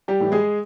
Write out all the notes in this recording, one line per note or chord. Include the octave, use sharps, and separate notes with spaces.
G3 G4
A2 E3
G#3 G#4